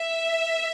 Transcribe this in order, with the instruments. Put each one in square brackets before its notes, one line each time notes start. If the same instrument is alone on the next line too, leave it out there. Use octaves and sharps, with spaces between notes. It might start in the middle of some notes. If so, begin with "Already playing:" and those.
Already playing: [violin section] E5